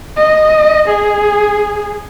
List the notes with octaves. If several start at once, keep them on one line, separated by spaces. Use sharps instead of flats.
D#5
G#4